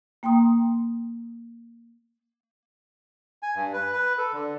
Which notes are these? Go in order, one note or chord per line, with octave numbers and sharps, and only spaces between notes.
A#3 G5 A#5 C6 D#6
G#5
G2
B4
B4
A4
D3